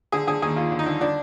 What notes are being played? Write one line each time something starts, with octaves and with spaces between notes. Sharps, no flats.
D3 G#4
D3 G#4
D#2 G#4
D#2 F4
D3
D#4
D3
D3 D4